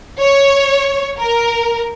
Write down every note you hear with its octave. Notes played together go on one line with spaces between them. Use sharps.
C#5
A#4